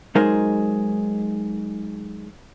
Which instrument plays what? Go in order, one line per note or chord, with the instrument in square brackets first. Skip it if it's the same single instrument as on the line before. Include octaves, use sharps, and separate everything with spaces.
[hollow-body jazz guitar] F#3 G#3 D#4 G#4 A#4 C5